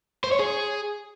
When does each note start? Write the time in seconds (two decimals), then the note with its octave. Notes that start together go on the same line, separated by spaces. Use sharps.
0.24 C5
0.32 C#5
0.39 G#4